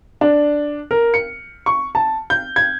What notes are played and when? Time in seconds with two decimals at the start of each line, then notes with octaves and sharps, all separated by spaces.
0.21 D4
0.91 A#4
1.14 C#7
1.66 C#6
1.95 A5
2.30 G6
2.56 G#6